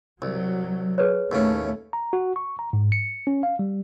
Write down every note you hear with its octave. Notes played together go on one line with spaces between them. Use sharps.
C2 F#3
G#4 B4 C#5
D#2 A2 A3 C#4
A#5
F#4
C#6
A#5
G#2
C#7
C#4
F5
G3